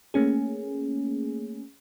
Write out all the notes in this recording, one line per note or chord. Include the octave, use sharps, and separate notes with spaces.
A3 A#3 C#4 G#4